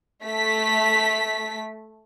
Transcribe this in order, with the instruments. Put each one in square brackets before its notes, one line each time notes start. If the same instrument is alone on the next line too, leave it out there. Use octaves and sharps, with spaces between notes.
[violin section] A3 B6